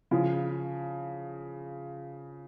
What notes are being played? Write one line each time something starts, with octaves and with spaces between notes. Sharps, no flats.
C#3 F3